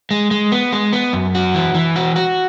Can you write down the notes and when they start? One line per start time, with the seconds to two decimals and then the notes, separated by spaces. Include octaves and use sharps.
0.11 G#3
0.31 G#3
0.52 B3
0.73 G#3
0.93 B3
1.13 F#2
1.35 F#4
1.54 E3
1.75 E3
1.96 F#4
2.16 F#4